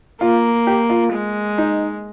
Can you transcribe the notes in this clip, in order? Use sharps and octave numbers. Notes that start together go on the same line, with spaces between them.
A#3 F4
G4
F4
G#3
D#4